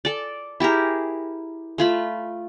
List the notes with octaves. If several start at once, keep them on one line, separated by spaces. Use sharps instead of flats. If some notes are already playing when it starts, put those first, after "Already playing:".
A4 D5
E4 G4 G#4 A#4
A3 F4 B5